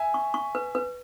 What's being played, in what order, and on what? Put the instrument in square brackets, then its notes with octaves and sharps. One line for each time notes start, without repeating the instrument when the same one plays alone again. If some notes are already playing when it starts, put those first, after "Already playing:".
Already playing: [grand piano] E5 G#5
[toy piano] C#6
C#6
B4
B4